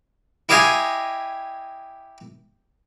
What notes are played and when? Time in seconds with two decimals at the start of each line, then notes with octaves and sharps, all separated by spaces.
0.49 E4 G4 D#5 F5 G#5